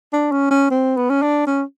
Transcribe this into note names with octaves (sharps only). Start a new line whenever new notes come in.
D4
C#4
C#4
C4
B3
C#4
D4
C#4